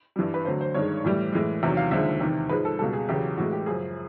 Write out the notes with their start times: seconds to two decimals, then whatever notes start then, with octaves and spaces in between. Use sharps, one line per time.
0.16 G2 E3 G3
0.34 B4
0.45 D2 D3 F#3 C5
0.61 C5
0.74 G2 D#3 G#3 C#5
1.04 A2 E3 G3
1.32 A2 E3 G#3
1.63 E2 C3 D#3 F#3
1.77 F5
1.91 D#2 D3 F3 G#3 E5
2.20 E2 C3 D#3
2.49 G#2 F3 G#3 B4
2.65 A4
2.79 C#2 B2 G3 A4
2.93 G#4
3.09 E2 C#3 F#3 G4
3.38 A2 E3 G#3 F#4
3.53 G4
3.66 F#2 C#3 F3 G#4